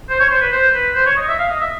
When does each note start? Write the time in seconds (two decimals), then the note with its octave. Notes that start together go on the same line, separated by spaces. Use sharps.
0.09 C5
0.20 C#5
0.30 C5
0.41 B4
0.52 C5
0.74 B4
0.95 C5
1.06 C#5
1.17 D#5
1.28 E5
1.39 F5
1.49 D#5
1.60 E5